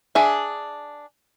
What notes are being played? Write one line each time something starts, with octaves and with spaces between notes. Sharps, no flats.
D4 G#4 E5